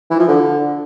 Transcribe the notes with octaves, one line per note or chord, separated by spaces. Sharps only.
E3
F3
D3